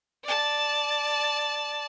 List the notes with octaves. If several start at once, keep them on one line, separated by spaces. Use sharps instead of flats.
D5 A5